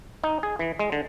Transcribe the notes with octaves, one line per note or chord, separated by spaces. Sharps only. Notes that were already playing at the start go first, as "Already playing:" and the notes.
D#4
G#4
E3
G#3
D3